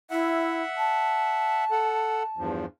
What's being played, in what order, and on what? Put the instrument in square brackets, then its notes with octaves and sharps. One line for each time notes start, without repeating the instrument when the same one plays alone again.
[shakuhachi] E4 [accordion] E5 F#5
[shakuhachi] A5
[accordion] A4 F#5
E2 G2 F3